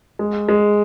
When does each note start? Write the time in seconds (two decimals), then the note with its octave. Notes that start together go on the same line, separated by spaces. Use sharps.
0.19 G#3
0.49 G#3